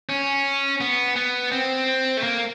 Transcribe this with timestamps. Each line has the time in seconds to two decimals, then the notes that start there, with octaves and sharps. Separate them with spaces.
0.09 C#4
0.81 B3
1.16 B3
1.52 C4
2.17 A3
2.23 A#3